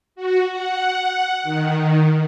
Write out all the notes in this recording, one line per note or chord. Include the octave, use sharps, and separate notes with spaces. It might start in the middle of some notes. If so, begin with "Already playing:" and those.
F#4
F#5
D#3